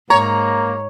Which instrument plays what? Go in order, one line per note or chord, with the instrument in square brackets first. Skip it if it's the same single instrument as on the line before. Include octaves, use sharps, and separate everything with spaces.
[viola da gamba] G#2 [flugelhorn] A#3 [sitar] C#5 [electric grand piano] A#5